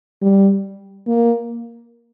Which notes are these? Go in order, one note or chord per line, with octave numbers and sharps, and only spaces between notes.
G3
A#3